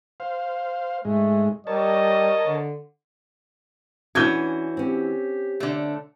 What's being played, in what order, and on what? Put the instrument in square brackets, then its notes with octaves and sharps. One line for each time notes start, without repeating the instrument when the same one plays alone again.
[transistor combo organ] C5 F5
[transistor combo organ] G#2 G#3 [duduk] A3
[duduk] G3 [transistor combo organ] A#4 C#5 A5 [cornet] D#5
[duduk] D3
[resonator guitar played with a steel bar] E3 F#4 [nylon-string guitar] C#4 D4 [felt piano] G6 G#6
[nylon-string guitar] C4 C#4 [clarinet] G4
[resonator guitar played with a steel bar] D3 A3